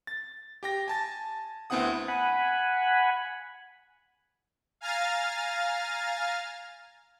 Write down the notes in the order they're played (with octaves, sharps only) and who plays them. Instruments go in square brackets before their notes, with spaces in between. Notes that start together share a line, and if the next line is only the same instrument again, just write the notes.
[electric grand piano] A6
G4 G5 A#6
G#5 A5 A6
D2 B3 C4 E4 F#5 D#6
[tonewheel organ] F#5 G#5 B5
[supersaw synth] F5 G#5 A#5 F6 A6